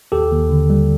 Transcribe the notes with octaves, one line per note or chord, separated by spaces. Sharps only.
D#2 G4 A4
D#2
D3
G3